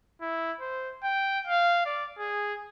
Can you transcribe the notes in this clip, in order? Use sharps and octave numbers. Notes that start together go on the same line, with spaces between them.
E4
C5
G5
F5
D5
G#4